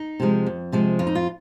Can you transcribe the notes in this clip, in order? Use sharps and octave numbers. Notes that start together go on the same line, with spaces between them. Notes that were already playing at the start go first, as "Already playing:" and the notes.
Already playing: D#4
C3 F3 G#3
F2
C3 F3 G#3
F2 F4
D#4
F4